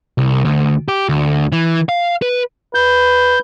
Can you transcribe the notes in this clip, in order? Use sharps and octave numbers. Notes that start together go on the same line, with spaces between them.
C2
D2
G4
D2
E3
F5
B4
B4 G6